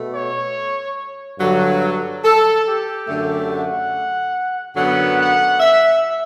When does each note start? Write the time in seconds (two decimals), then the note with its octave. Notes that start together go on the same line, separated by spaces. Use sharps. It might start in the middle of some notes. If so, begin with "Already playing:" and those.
Already playing: B2 A3
0.14 C#5
1.39 G2 D3 F#3
2.24 A4
2.66 G4
3.08 F#2 D3 A3
3.50 F#5
4.76 F#2 D3 F#3 B3 F#5
5.18 F#5
5.60 E5